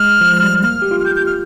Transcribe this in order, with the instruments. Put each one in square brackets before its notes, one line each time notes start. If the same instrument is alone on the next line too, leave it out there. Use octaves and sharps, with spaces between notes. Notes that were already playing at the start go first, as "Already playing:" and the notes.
Already playing: [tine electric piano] G#3 [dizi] F6
[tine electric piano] F3
G3
[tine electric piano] A#3 [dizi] F6
[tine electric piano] G4
F4
[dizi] F6
[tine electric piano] G4 [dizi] G6
[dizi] G6
F6